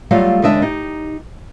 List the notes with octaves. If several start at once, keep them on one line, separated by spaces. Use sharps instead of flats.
F#3 G3 A3 F4 F5
D#2 C#3 G#3 D4 D#5 E5
D#4 G4